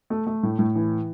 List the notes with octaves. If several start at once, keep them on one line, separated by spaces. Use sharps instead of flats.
A3
A3
A2
A2
E3